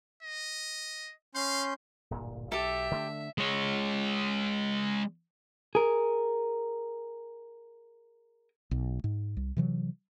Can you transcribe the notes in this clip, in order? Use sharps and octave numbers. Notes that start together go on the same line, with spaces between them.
D#5
C#4 F5 C6 G6
D1 G1 A#2
B1 G4 A4 E5
D3 A3 D4
G#3 C#5
G#4 A#4
B1
G#2
C2
C3 E3 F#3